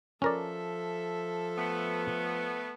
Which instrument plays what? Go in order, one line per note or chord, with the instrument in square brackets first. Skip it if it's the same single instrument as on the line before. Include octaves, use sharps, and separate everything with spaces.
[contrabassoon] F3 [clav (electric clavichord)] C#4 A#4 D5 [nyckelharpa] A4 E5
[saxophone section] A3 B3